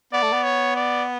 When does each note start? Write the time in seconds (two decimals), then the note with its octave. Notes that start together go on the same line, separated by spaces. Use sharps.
0.13 B3 D5
0.23 A3
0.33 B3
0.44 C#5
0.76 D5